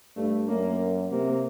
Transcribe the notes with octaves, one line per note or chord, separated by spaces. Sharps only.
G2 A3
F#2 A#3
C3 A#3